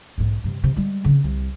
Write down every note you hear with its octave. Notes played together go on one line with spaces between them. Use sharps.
B1 G#2
G2 C3
C3
G3 G#3
C#3 C4
C2